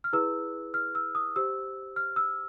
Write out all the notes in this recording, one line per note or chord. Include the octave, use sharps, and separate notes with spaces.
F6
E4 G#4 B4 E6
F6
E6
D#6
G4 C5 E6
F6
E6